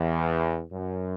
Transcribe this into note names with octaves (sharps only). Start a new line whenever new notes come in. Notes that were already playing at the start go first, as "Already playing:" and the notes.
Already playing: E2
F#2